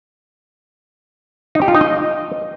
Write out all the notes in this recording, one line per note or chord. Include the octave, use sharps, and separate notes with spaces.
D#4
G4
F4
D#4
D#5